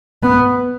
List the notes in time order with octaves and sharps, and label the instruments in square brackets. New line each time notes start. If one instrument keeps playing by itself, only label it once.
[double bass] B3